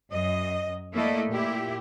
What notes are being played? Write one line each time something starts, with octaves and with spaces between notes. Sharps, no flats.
F#2 D#5
A3 A#3 E4 A4 D5 D#5
A#2 E4 G4